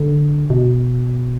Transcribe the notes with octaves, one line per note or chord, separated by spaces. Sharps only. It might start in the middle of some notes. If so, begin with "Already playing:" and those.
Already playing: D3
B2